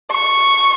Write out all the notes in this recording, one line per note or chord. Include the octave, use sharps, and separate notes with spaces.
C#6